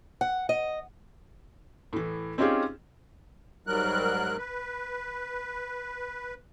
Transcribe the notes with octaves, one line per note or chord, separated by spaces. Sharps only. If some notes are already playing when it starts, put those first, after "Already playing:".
F#5
D#5
A2 E3
C4 C#4 D#4 F4 G4 G#4
G#2 F#3 G3 A#4 F#6
B4